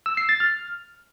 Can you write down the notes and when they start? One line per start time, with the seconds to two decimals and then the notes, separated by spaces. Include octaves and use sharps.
0.06 E6
0.17 C7
0.29 A6
0.40 F6